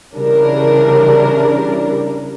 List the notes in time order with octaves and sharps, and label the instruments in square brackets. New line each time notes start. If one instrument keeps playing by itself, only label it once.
[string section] C#3 E3 G3 D4 A#4